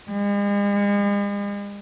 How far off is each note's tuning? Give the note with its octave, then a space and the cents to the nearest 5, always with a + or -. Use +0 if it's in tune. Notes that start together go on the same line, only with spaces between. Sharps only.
G#3 -45